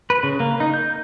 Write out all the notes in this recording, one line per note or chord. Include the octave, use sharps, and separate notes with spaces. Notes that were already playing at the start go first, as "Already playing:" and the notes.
B4
C#3
A#3
D#4
G6